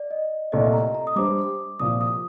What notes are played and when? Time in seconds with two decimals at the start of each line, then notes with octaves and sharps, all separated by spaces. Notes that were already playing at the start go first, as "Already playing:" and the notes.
Already playing: D5
0.11 D#5
0.52 C2 A#2 A3 D#5
0.73 A#5
0.95 A#5
1.07 D#6
1.16 G3 D4 G4 C5 D6
1.80 C2 A#2 F3 D#6
2.01 D#6